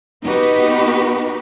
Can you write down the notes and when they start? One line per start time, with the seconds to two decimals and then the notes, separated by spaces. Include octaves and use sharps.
0.24 B3 D#4 F#4 G4 B4